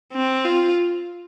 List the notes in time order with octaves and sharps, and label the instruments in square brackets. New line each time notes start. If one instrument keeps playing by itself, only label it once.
[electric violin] C4
F4